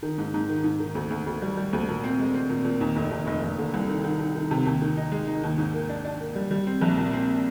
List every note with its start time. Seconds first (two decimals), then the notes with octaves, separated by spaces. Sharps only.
0.03 D#3
0.18 G#2
0.34 G#2
0.49 D#3
0.64 G#2
0.80 D#3
0.95 D2
1.10 D2
1.26 D2
1.42 G3
1.57 G3
1.73 D2
1.88 A#2
2.04 C4
2.19 G#3
2.34 C4
2.50 A#2
2.65 A#2
2.81 D#2
2.96 F1
3.11 D#2
3.27 F1
3.43 F1
3.58 D3
3.74 C2
3.88 D#3
4.04 D#3
4.19 D#3
4.35 D#3
4.51 C3
4.66 D#2
4.82 D#3
4.97 D#4
5.12 G#3
5.27 D#4
5.43 D#2
5.58 G#2
5.74 A#3
5.89 D4
6.05 D4
6.20 A#3
6.35 G3
6.51 G3
6.67 C4
6.81 A#1
6.97 A#2
7.13 C4